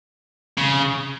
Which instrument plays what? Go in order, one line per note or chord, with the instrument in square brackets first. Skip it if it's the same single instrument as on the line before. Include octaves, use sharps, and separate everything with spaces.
[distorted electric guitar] C#3